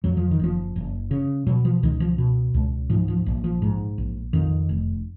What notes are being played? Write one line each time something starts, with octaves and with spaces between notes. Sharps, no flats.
F2 F#3
F3
D#3
F#1 F3
F#1
C#3
B2 F#3
F3
C#2 D#3
F3
B2
C#2
G#2 F3
F3
A#1
F3
G#2
A#1
F2 D#3
F1